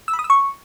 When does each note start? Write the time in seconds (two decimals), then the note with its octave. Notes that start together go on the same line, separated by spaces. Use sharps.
0.08 E6
0.13 B5
0.19 D#6
0.24 E6
0.30 C#6